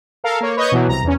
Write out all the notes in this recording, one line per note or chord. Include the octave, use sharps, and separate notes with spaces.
A4 A#4 F5
A#3 C#5
B4 C#5 D#5 C#6 D#6 G6
B2 E3 F#3
C2 A#5
E2 C#4